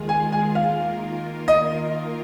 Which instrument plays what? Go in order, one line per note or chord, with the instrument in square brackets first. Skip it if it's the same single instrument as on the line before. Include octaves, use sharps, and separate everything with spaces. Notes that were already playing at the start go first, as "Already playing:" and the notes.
Already playing: [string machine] D#2 D#3 G#3 F4 G#4
[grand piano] G#5
G#5
[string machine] D#3 A#3 F4 A#4 [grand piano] F5
[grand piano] D#5